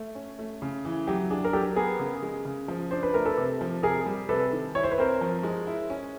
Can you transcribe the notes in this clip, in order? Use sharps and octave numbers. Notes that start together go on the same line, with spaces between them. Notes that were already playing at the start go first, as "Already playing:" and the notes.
Already playing: A3
C#4
A3
C#3
E3
F#3 G4
D4 G#4
A#4
F#3 G4 A4
B3 G#4 A#4
C#3
G#3
C#3
F3
D4 C5
B4
A3 A#4
A4 B4
C3
F3
C3 G#4 A#4
G3
C3 A4 B4
D#3
E4 C#5
C5
B4
C4 A#4 C5
F3
G#3
E4
C#4